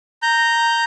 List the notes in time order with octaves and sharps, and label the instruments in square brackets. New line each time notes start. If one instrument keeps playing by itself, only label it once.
[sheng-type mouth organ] A#5 G6